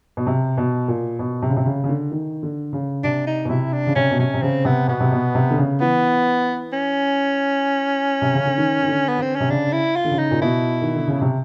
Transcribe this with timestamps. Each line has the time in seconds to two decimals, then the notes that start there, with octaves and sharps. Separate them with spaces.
0.17 B2
0.27 C3
0.58 B2
0.88 A#2
1.19 B2
1.42 C3
1.49 C#3
1.57 C3
1.66 C#3
1.84 C#3
1.89 D3
2.12 D#3
2.43 D3
2.73 C#3
3.04 C3 D4
3.27 D#4
3.45 B2
3.50 C3 E4
3.73 D4
3.87 C#3
3.95 C3 C#4
4.11 B2
4.19 C3 C#4
4.34 C3
4.42 C#3 C4
4.65 C3 B3
4.88 B2 B3
5.00 C3
5.12 B2
5.35 C3
5.50 D3
5.58 C#3
5.81 E3 B3
6.73 C#4
8.22 C3
8.34 C#3
8.45 D3
8.58 D#3
8.83 D#3
8.88 D3
9.08 B3
9.18 D3 C4
9.36 C3 C#4
9.50 C#3 D4
9.72 E4
9.96 F4
10.05 D3
10.11 C#3
10.19 D#4
10.31 A#2
10.42 B2 E4
10.82 D#3
10.96 D3
11.08 C#3
11.21 C3